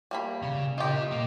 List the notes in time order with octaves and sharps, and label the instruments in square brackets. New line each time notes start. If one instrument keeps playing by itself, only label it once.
[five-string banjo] G3 A#3 B5
[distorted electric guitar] C#3
[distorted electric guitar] F4 A#4 [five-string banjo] G4 D#5
[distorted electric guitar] A#2 A#3